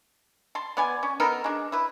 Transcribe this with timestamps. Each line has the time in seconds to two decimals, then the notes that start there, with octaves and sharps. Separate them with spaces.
0.55 A5 C6
0.77 B3 D5 G#5
1.03 C#4
1.20 B3 D#4 A4 A#4
1.44 G#3 D4
1.72 E4 B4